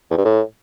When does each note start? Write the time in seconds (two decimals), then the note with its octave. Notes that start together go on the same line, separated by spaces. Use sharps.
0.11 E2
0.18 G2
0.25 A2